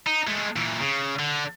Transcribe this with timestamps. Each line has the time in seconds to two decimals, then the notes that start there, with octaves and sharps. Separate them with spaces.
0.07 D#4
0.27 G#3 A3
0.56 A#2 E3
0.80 C#3
1.19 D3